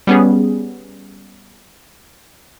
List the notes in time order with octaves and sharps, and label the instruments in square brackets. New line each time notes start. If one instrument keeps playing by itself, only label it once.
[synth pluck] G3 B3 C#4 G#4